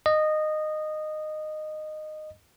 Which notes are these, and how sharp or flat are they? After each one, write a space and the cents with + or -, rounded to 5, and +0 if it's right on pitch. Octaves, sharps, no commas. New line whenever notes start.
D#5 -15